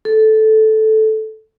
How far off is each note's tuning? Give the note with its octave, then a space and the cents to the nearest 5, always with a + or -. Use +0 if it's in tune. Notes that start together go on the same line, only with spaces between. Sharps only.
A4 -10